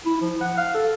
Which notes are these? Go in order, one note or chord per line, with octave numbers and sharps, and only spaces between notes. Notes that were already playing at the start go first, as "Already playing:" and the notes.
E4
F3
F#5
F5
A4